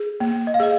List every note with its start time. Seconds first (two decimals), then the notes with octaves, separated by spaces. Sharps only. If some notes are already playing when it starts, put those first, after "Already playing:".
Already playing: G#4
0.20 A#3
0.47 D#5
0.54 F5
0.60 G#4 D#5